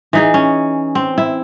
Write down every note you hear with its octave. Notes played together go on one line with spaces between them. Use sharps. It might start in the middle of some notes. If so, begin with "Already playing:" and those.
E3 D#4 G#4
C#4
C4
E4